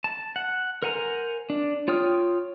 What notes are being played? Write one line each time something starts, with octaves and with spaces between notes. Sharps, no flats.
A5
F#5
A#4 C5 F#5 G#5 A#5
D4
F4 C#5 G5 D#6 F6